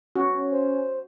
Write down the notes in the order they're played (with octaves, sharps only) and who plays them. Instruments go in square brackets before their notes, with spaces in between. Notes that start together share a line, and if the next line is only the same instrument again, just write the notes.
[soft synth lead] C#4 [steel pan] F#4
[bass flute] C5